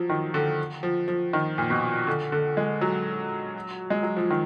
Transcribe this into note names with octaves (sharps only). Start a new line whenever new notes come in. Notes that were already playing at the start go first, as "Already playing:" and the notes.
Already playing: F3 F#3
D#3
D3
F3
F3
D#3
A#2
B2
D3
D3
G#3
F#3
G#3
F#3
F3
D#3